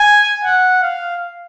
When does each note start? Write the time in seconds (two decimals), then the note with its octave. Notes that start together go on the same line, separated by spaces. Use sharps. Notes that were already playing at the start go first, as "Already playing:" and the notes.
Already playing: G#5
0.44 F#5
0.83 F5